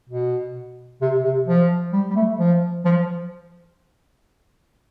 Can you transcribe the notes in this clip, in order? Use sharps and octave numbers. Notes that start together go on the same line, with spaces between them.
B2
C3
C3
F3
G3
G3
A3
F3
F3